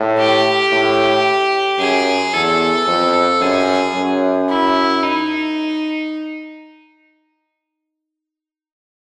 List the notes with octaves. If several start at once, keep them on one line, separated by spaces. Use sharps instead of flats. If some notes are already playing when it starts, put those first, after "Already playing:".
Already playing: A2
G4
A2
F#2 G#4
E2 A4
F2
F#2 G#4
F#2
E4
D#4